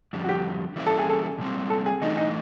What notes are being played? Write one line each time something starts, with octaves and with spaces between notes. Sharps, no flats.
F2 D3 G3
F#4
G4
E3 G3 A#3 C#4 E4
A4
G#4
A4
A#2 G3 C4
A4
G#4
E3 A3 D4 D#4
D#4